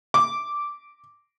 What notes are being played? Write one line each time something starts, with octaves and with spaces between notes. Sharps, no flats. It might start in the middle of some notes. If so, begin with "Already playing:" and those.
D6